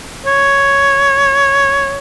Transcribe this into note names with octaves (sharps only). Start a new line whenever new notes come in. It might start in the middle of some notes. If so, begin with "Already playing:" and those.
C#5